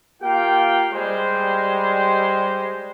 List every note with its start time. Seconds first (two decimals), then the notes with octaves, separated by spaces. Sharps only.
0.23 A#3 F4 G4 F5 G5
0.93 G3 G#3 C5